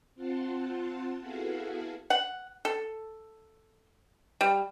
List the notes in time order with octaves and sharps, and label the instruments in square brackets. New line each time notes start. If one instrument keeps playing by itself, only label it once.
[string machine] C4 F4 F#5 A5 C6
B3 E4 F#4 G#4 A4 F5
[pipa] F#5
A4
G3